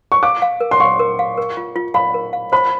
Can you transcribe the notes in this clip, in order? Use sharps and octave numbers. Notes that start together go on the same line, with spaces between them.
C#6
F5 D6
F5
A#4
C6
F5 C#6
A#4
F5
A#4
F4
F4
F5 B5
A#4
F5
C5 B5